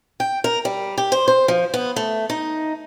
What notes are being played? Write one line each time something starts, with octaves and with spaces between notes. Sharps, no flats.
G5
A#4
G3
G4
C5
C5
F3
B3
A3
D#4